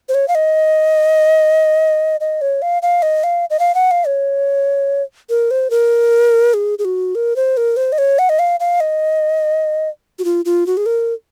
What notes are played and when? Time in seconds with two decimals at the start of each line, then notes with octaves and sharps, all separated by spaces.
0.09 C5
0.14 C#5
0.28 F5
0.35 D#5
2.20 D#5
2.41 C#5
2.62 F5
2.82 F5
3.02 D#5
3.23 F5
3.50 D#5
3.59 F5
3.75 F#5
3.91 F5
4.06 C#5
5.29 A#4
5.51 C5
5.70 A#4
6.54 G#4
6.79 G#4
6.85 F#4
7.15 A#4
7.36 C5
7.57 A#4
7.76 C5
7.92 D#5
7.98 C#5
8.19 F#5
8.29 D#5
8.39 F5
8.60 F5
8.80 D#5
10.19 F#4
10.24 F4
10.45 F4
10.66 F#4
10.77 G#4
10.86 A#4